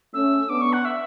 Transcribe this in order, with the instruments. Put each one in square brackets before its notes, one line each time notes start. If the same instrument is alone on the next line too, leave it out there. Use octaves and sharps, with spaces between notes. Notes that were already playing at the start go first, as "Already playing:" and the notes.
[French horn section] A3 C#4 [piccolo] E6
[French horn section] B3 D4 [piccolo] D6
[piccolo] C#6
F#5
E5